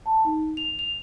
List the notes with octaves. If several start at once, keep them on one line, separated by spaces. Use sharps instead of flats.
A5
D#4
F7
F7